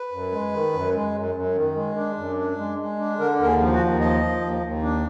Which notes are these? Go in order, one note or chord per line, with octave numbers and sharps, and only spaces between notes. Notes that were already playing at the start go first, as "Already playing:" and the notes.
Already playing: B4
F#2
G#3
D#3
F#2
G#3
F#2
F#2
D#3
G#3
D4
F#2
D4
G#3
G#3
D4
D3 A#4
D#2 A#4
G#4
F3
F#4
D#2
F3 D#5
F3
D#2
D#2
D4